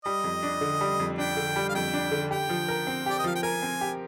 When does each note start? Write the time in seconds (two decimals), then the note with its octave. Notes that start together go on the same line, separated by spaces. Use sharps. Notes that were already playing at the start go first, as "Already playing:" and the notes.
0.05 G3 D#5
0.24 F2
0.43 D4
0.61 D3
0.81 G3
1.00 F2
1.18 D4 G5
1.37 D3
1.56 G3
1.69 F5
1.75 F2 G5
1.94 D4
2.12 D3
2.31 G4 G5
2.49 F3
2.69 A#4
2.87 C4
3.06 G4 D5
3.19 D#5
3.24 F3 F5
3.35 G5
3.43 A#4 G#5
3.62 C4
3.81 G4